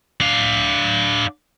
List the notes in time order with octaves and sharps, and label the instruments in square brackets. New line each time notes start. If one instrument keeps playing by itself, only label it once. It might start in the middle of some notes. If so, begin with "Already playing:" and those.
[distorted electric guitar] D4 F5